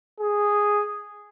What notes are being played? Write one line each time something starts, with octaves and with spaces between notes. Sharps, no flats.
G#4